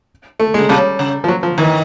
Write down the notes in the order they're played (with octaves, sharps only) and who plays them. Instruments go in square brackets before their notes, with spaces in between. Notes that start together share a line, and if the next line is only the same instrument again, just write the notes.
[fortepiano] A3
G#3
[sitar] C#3
[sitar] C3 [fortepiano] G3
[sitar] C#3
[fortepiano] F3
F#3
F3
[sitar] D#3 [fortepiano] E3